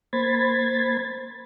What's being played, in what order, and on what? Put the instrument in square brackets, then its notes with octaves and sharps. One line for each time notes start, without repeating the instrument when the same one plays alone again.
[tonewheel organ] A#3 C5 B5 G#6 A6